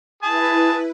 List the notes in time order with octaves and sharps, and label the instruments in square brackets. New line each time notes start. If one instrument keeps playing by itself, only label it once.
[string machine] E4 B4 [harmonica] G#4 A5